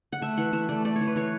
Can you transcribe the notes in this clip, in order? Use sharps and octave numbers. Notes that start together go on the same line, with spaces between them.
F#5
A3 E5
E3 F#5
E3 E5
A3 D5
A3 D5
C#5
E3
B4
E3 C#5